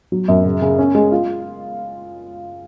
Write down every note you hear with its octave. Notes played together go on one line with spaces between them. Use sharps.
F#3
F#2
C#3
C#3
C#4
G#3
F4